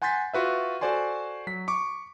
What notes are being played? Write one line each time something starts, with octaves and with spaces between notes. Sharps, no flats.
F#5 G#5 C6 G6 A6 B6
F4 F#4 B4 E5
F#4 A4 C5 D5 G#5 C6
F#3 B6
C#6 D6